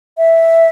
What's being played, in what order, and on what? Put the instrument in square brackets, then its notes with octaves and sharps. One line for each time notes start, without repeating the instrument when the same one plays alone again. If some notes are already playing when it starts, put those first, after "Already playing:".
[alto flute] E5